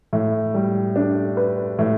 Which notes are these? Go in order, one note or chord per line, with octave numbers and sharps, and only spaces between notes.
A2
G3
D4
B4
A2